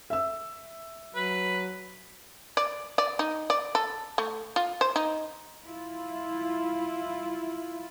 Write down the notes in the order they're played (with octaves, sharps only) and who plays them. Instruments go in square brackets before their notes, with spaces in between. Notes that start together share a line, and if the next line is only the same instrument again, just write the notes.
[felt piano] E5 E6
[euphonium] F#3 [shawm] B4
[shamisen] D5
D5
D#4
D5
A4
A3
F4
C5
D#4
[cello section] E4 F4